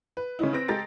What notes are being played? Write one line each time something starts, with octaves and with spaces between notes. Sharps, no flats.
B4
C#3 C#4 D#4 E4
C4 B4 C5 A#6 D7
G#3 G4 A4 A#5 A6 D7